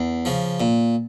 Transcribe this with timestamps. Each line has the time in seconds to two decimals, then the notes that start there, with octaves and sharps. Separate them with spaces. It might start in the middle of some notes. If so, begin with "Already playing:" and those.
Already playing: E2
0.25 C#3 F3
0.60 A#2